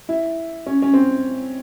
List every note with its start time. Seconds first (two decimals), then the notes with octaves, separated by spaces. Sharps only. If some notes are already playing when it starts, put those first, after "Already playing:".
0.09 E4
0.66 C#4
0.82 C#4
0.94 C4